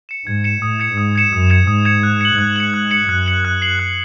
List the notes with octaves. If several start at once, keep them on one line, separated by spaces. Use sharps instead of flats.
C#7 E7
G#2 G#6
C#7 E7
A2 D#6
G#6 C#7 E7
G#2 D#6
G#6 C#7 E7
F#2 D#6
G#6 C#7 E7
G#2 D#6
G#6 C#7 E7
F#6
C#7 F#7
G#2 F#6
C#7 F#7
F#6
C#7 F#7
F#2 F#6
C#7 F#7
F#6
C7 F#7
F#6